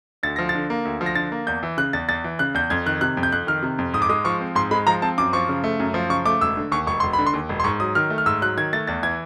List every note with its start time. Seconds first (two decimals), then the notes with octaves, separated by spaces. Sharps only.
0.23 D2 A6
0.36 F3 A#6
0.49 A6
0.55 D3
0.70 A#3
0.85 D2
1.01 F3
1.06 A#6
1.15 D3 A6
1.32 A#3
1.47 E2 G6
1.63 E3
1.77 C#3 F#6
1.93 E2 A6
2.09 E2 A6
2.24 E3
2.39 C#3 F#6
2.54 E2 G6
2.70 F2 G#6
2.86 D#3 F#6
3.01 C3 F#6
3.17 F2
3.23 G6
3.32 F2 F#6
3.47 D#3 F6
3.63 C3
3.78 F2
3.93 G#2 D#6
4.02 D6
4.09 G#3 D#6
4.25 F3 C#6
4.41 C4
4.55 G#2 C6
4.71 G#3 B5
4.87 F3 A#5
5.02 C4 A5
5.18 F#2 D6
5.33 F3 C#6
5.49 C#3
5.64 A3
5.80 F#2
5.94 F3
6.10 C#3 C#6
6.25 A3 D6
6.41 E1 E6
6.57 D3
6.72 D#2 C#6
6.87 E1 C#6
7.00 E1 C6
7.13 B5
7.19 D3
7.27 C6
7.34 D#2
7.49 E1
7.60 C6
7.64 G#2 C#6
7.80 F#3 D#6
7.95 D#3 F6
8.10 A3
8.18 F6
8.26 G#2 E6
8.42 F#3 F#6
8.57 D#3 G#6
8.73 A3 A6
8.87 E2 A6
9.03 E3 G#6